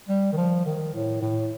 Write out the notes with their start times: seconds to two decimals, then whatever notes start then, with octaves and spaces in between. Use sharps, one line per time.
0.09 G3
0.32 D#3
0.37 F3
0.66 D#3
0.94 A2
1.22 A2